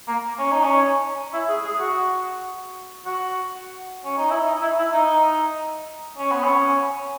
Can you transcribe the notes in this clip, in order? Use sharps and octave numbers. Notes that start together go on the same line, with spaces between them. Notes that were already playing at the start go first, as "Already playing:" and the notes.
A#3
C#4
D#4
C#4
E4
G#4
G#4
F#4
F#4
C#4
D#4
E4
D#4
E4
E4
D#4
C#4
B3
C#4